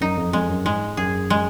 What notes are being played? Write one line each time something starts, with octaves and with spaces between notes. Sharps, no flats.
F#2 D#4
F2
F2 G#3
F#2
G#2 G#3
F#2 G#4
G#3